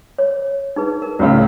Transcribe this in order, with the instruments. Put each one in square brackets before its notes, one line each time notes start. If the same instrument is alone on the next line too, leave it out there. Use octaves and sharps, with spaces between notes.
[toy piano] C#5
D#4 G#4 B4
A#4
[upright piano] C#2 A2 C#3